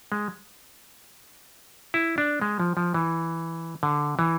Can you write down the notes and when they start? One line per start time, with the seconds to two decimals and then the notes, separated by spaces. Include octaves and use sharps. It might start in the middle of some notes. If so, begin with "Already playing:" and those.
0.12 G#3
1.94 E4
2.18 D4
2.42 G#3
2.60 F3
2.77 F3
2.94 E3
3.83 D3
4.19 E3